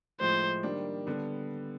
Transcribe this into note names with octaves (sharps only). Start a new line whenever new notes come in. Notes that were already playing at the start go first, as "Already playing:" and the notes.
A2 F3 G#3 C5
D#3 G3 A#3 D4
D3 G3 B3